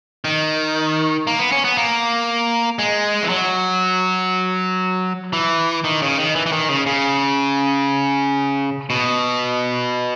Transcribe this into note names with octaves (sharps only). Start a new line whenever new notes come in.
D#3
A#3
B3
C#4
B3
A#3
G#3
E3
F#3
E3
D#3
C#3
D#3
E3
E3
D#3
C#3
C#3
B2